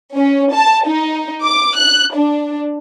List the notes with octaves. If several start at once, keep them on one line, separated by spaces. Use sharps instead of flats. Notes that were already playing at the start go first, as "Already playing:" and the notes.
C#4
A5
D#4
D6
F#6
D4